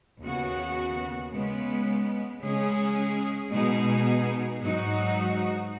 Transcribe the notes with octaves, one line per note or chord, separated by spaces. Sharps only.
D#2 C#3 B3 F#4
C#3 G#3 B3
C#3 G#3 C#4 G#4
B2 G#3 D#4 G#4
G#2 F#3 D#4 F#4